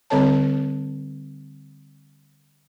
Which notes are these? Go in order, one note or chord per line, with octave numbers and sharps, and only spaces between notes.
D3 G3 C4 A4 C#5 A5